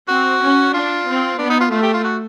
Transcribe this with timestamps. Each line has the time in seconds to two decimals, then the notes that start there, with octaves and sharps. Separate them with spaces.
0.08 C4 F#4
0.41 C#4
0.73 D4 F4
1.07 C4
1.39 B3 D4
1.50 D#4
1.60 F4
1.71 A3 F4
1.83 G4
1.94 F4
2.04 F#4